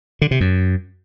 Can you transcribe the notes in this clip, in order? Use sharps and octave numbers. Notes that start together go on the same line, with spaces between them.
D3
C3
F#2